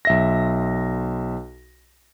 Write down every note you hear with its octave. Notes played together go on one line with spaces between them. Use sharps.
B1 E5 A#6